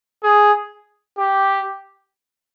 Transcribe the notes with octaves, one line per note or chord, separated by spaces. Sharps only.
G#4
G4